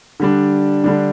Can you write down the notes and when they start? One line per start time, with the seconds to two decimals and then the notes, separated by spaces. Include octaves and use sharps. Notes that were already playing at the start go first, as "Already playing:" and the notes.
0.20 D3 G3 D4
0.84 D3 G3 D4